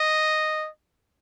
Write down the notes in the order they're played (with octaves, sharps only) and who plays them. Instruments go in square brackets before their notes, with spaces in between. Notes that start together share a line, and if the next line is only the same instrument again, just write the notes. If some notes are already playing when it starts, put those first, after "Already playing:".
Already playing: [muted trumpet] D#5